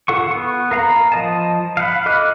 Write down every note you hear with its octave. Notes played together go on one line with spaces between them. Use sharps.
F4 A4 F#5 C#6
B3
A#4 F5 A#5 B5
F3 D#5 A5
F5 F#5 B5
A4 D#5 D6 F6 F#6